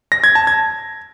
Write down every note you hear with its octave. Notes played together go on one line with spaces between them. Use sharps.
A#6
G#6
A5
G#6